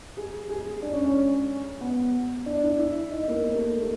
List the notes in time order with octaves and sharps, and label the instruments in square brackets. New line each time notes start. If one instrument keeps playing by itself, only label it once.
[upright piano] G#4
G#4
D4
C#4
C#4
B3
D4
E4
E4
D#4
A#3
A#3
A3
A3